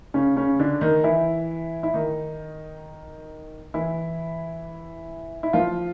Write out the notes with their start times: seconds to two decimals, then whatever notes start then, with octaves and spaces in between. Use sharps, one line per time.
0.14 C#3 C#4
0.36 C#3 C#4
0.59 D3 D4
0.81 D#3 D#4
1.04 E3 E4
1.83 E4
1.94 D#3 D#4
3.74 E3 E4
5.43 E4
5.53 F3 F4